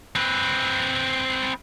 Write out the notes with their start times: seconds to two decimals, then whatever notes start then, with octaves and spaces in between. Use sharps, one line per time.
0.15 C4 B4